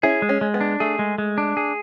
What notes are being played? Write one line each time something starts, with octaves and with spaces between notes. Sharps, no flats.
C#4 E4 G#4
G#3
C#4
G#3
B3
D4
A3 G#4
G#3
G#3
D4
G#4